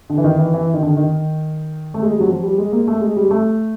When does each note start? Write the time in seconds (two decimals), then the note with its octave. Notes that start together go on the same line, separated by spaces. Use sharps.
0.10 D3
0.18 E3
0.24 D#3
0.38 E3
0.53 E3
0.74 D#3
0.82 D3
0.97 D#3
1.94 A3
2.02 G#3
2.12 G3
2.20 F#3
2.29 F3
2.43 G3
2.58 G#3
2.72 A#3
2.88 A3
3.01 G#3
3.16 G3
3.31 A3